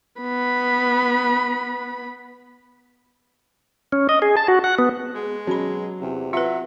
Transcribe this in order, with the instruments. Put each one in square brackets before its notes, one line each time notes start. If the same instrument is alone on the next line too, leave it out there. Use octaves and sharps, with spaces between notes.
[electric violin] B3 B5
[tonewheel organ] C#4
D#5
G#4
A5
F#4
F#5
B3
[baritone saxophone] G#3 [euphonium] G#4
[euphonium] B2 [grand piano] F#3 [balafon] C#4 B5
[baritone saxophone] E2 [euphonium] C3
[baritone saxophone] F#3 [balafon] F4 B4 [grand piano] E5